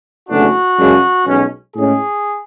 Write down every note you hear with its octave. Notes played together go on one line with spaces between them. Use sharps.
F#1 E2 D3 A3 D4 F#4
F#2 C#3 G#3 D4
B1 B2 G#3 C#4
A2 G#3 C#4 G#4